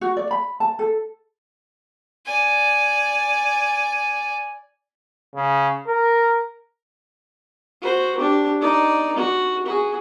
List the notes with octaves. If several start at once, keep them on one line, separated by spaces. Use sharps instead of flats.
F#4
D5
B5
A5
A4
D5 G#5
C#3
A#4
F#4 C5
D4 G4
D#4 D5
F#4
F#4 G#4